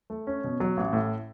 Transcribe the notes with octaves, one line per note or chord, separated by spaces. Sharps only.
A3
C#4
B2
F#3
A1
A2